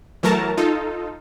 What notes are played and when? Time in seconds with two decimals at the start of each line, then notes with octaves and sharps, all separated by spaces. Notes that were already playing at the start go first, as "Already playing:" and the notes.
0.23 E3 F#3 A3 A#4 A5 A#5
0.57 D#4 F4 A4